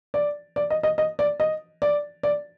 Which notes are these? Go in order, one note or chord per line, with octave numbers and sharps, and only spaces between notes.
D5
D5
D#5
D#5
D#5
D5
D#5
D5
D5